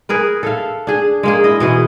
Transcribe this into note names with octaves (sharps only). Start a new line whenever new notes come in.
G#4 A#4 B4
A4 E5 F5
D4 G#4
G#3 A#3 G#4
E4 D#5
B2 E3 G#4 D#5